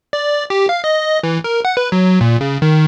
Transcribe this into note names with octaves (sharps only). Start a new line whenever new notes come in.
D5
G4
F5
D#5
E3
A#4
F#5
B4
F#3
A#2
C#3
D#3